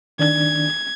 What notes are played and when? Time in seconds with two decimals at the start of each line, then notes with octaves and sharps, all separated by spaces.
0.19 D#3 D4 G#6